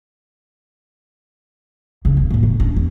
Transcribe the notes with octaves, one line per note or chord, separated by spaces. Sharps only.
C#3 D4
E1
A#1 A2
C#3
C#4 D4
E2